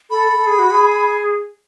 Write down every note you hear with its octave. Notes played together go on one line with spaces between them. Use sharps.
A4 B5
A4
G#4
F#4
G#4